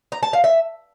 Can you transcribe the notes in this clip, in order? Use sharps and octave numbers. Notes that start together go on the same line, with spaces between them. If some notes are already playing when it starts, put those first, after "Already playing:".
A#5
A5
F5
E5